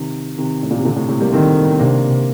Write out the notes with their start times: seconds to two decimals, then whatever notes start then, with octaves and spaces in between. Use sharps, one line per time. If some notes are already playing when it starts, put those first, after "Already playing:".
Already playing: C3 D#3
0.38 C3 D#3
0.63 A2
0.71 A#2
0.78 C3
0.85 A#2 D3
0.96 A2 C3
1.09 A2 C3
1.20 G3 A#3
1.32 D#3 A3 C4
1.71 C4
1.79 C3 A#3 D4